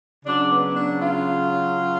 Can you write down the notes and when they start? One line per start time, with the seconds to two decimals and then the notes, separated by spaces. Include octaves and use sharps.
0.24 C#3 F#3 D4
0.50 B3
0.76 D4
1.01 F4